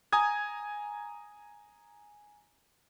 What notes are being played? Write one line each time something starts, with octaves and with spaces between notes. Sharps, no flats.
G#5 A#5 D#6 G#6